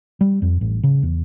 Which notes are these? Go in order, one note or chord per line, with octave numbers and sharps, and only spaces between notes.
G3
F2
A1
C#3
E2